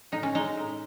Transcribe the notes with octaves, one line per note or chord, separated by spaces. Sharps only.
A2 D#4
C#4
G#3 D#4
A2